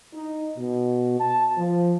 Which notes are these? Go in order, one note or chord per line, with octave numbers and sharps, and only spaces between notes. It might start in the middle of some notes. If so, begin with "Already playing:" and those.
D#4
B2
A5
F3